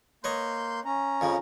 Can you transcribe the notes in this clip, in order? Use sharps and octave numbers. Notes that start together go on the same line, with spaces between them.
A#3 B4 C#5 D#5 C6 G6
C#4 A#5
F2 C#3 F3